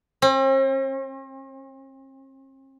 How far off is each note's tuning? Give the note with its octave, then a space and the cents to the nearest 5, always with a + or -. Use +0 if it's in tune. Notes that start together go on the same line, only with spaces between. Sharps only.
C4 +45